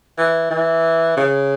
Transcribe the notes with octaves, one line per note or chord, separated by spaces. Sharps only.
E3
E3
C#3